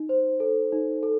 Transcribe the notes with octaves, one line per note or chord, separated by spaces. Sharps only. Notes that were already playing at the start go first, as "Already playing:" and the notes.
Already playing: D#4
C5
A4
D#4
A4